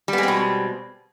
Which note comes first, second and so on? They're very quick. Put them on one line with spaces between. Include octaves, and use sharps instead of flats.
G3 B3 G#3 C4 B2